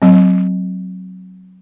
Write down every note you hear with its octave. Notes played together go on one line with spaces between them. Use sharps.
F#3 C4